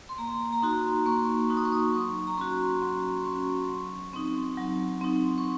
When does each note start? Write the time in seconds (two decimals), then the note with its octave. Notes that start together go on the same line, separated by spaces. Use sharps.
0.09 C6
0.18 A#3 A#5
0.52 A#5
0.62 D#4 F#4 C6
1.06 A#3 C#6
1.50 D#4 F#4
1.57 D#6
1.65 C#6
1.72 D#6
1.94 F#3 C#6
2.27 A#5
2.38 C#4 F#4 C6
2.82 F#3 C6
3.26 C#4 F#4 C#6
3.69 F#3
4.13 C4 D#4
4.57 F#3
5.01 C4 D#4
5.38 C#6